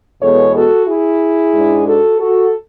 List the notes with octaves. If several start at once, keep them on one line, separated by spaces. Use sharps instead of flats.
E2 B2 G#3 B3 A4 C#5
F#4 A4
E4 G#4
G#2 G#3 D4
F#4 A4
F#4 A4